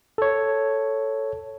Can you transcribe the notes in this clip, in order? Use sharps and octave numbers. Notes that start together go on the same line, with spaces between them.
A4 C#5